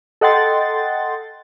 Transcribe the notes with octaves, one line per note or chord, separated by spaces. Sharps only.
A4 D#5 F#5 G5 C6 A6